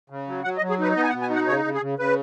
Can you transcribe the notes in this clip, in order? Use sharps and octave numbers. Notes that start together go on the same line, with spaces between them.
C#3
F#3
F#3 F#5
D#5
F#3
G#4
D#4 B4
B3 D#5
G#5
F#5
B2
G#5
D#4 F#5
C#3 C#5
C#3
G#4
C#3
C#3 B4